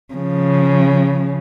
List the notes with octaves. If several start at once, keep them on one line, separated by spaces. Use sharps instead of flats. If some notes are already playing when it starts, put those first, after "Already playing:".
C#3 F3